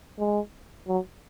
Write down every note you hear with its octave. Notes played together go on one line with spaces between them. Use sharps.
G#3
F#3